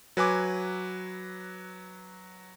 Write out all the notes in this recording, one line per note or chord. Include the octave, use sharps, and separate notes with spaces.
F#3 B4 G#5 D6